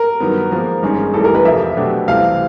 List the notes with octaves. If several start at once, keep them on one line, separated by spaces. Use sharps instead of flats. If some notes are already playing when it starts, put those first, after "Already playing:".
Already playing: A#4
G2 D#3 F#3 B3
G#2 F3 A#3
G#1 G2 D#3 G#3 C#4
A1 G2 E3 G3 A4
A#4
B4
F2 C3 F3 E5
B2 F#3 A3 D4 G4
C2 C3 E3 A3 F5